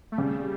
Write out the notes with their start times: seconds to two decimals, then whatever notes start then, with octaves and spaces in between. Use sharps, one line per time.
0.12 A3
0.18 C#3 G3